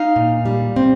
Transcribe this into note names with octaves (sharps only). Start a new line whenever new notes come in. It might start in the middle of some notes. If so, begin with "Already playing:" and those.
Already playing: D#4 F5
A#2
G3
C4